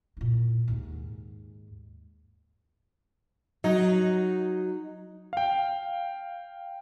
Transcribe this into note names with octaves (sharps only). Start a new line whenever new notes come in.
A#2 E4
D#2 G#2
F#3 D#4
F5 G5